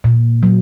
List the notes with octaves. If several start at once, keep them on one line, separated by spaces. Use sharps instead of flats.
A#2
F#3